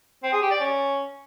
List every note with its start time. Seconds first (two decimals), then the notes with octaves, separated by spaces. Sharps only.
0.23 C4
0.32 G#4
0.42 G4
0.51 D5
0.60 C#4